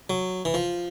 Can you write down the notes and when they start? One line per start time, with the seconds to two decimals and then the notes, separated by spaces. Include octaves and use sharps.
0.10 F#3
0.45 E3
0.54 F3